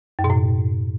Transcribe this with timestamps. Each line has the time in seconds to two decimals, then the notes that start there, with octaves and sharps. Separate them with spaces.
0.19 F#2
0.24 B2
0.30 A2